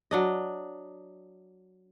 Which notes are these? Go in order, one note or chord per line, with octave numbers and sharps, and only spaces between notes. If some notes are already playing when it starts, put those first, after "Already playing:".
F#3 D4 D#5